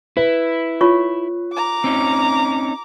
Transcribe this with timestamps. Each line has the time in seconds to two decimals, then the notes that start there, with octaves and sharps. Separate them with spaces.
0.17 E4 B4
0.81 F4 C#5 C#6
1.53 A#5 D6
1.84 C4 C#4 D#4